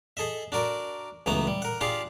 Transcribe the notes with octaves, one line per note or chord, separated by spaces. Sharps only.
G#4 A4 D#5 E5
D4 F#4 A#4 D5
C#2 E3 F#3 A3 B3 A#5
G3
A#4 F#5
D4 F4 G4 G#4 F5